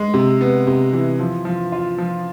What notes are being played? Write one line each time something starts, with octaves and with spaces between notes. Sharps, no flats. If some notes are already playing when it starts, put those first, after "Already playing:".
Already playing: G#3
C3
B3
C3
E3
F3
F3
F4
F3